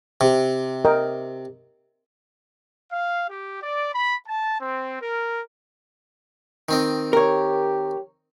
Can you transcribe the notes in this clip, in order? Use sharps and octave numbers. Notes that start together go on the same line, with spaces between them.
C3
A#4 D#5 G5
F5
G4
D5
B5
A5
C4
A#4
D#3 C4 D#5
G4 A#4 C#5